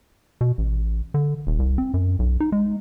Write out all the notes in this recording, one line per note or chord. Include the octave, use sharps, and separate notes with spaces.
B2
A1
D3
D#1
C2
C4
F#2
B1
D#4
G#3